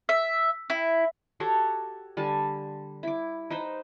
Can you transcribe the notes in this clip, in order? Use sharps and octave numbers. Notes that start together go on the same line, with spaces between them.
E5
E4
F#4 G4 A4 C#5
D3 G3 G#5 A5
E4 D6
D#4 B4 C5 G5